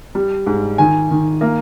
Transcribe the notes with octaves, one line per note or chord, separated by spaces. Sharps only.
G3
G#2
D#3 G#5
D#3
A#3